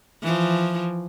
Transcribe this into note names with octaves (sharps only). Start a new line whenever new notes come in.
E3 F3